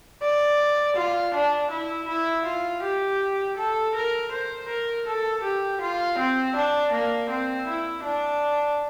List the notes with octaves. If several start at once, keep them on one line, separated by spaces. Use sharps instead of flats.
D5
F4
D4
E4
E4
F4
G4
A4
A#4
C5
A#4
A4
G4
F4
C4
D4
A#3
C4
E4
D4